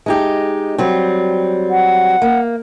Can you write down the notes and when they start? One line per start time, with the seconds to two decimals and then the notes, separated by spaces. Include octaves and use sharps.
0.06 G#3 D#4 G4
0.78 F#3 G3 C4
1.70 F#5
2.22 A#3